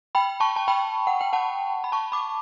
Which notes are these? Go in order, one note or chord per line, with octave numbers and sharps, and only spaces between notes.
G5 B5
A5 C#6
A5
G5 B5
F#5
G5
F#5 A5
B5
A5 C#6
B5 D6